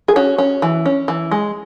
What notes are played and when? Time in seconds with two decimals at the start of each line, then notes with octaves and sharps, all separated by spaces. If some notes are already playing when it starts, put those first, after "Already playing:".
0.08 G#4
0.16 C#4 F#4
0.38 C#4
0.62 E3
0.86 C#4
1.08 E3
1.31 G#3